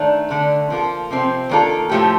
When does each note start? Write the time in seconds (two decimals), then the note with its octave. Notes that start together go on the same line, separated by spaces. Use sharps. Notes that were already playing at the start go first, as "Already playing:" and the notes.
Already playing: D#3 A3 D4
0.30 D3 A3 D4
0.70 F3 A#3 F4 A4
1.10 C3 F3 C4
1.49 D#3 A#3 D4 F4 A4
1.89 A2 F3 A3 C4 G4